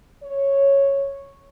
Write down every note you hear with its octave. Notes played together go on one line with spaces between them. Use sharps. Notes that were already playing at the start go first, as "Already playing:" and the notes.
C#5